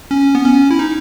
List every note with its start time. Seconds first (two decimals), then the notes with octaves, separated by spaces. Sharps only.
0.11 C#4
0.35 B3
0.45 C#4
0.71 E4
0.79 D#4